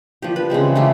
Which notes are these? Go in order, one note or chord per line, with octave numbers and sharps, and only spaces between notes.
F3 D4 G4
B4
C#3 E3 G#3 C4
A3 F4 G4 E5